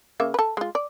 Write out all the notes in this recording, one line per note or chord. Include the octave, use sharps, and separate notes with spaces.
C#3 A#3 E5
A4 B4
G#3 F4
D5